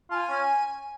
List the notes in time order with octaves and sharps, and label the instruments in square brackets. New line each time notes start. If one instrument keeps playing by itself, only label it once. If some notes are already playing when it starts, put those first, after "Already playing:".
[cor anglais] F4 [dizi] A5
[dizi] G#5
[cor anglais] C#4